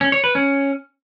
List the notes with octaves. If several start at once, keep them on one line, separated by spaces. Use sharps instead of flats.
C#4
C#5
B4
C#4